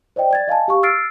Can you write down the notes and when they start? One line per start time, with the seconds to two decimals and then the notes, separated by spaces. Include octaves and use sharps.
0.16 C5 D5 D#5 G5
0.31 D5 G#6 A6
0.48 D#5 F5 G#5 A5
0.68 G4 F5 C#6
0.83 E6 F6 A6 C7 D7